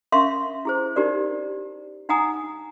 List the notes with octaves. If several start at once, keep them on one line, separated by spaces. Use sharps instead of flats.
C#4 A#4 E5 F5 C6 C#6
E4 G#4 C5
D#4 G4 A#4 D5
D#4 F#5 G#5 A#5 D#6